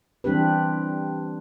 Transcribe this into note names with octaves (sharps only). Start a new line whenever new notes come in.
E3 G3 C4 D4 G4 B4